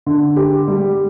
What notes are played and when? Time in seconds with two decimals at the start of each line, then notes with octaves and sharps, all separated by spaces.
0.06 D3
0.36 G4
0.68 G3